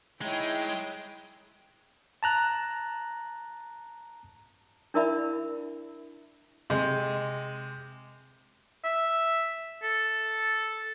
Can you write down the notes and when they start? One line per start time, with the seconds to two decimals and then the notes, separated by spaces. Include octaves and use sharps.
0.22 G#3 D#4 E4 C#5 G5
2.23 A5 A#5 F#6
4.94 D4 E4 A#4 D5 E5 B5
6.70 C3 G#3
8.84 E5
9.83 A4